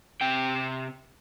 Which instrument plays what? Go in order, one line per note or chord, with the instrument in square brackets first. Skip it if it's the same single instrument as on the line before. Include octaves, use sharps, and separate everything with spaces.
[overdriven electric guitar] C3 G5